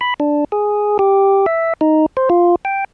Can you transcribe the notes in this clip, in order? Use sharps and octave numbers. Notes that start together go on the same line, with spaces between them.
B5
D4
G#4
G4
E5
D#4
C5
F4
G5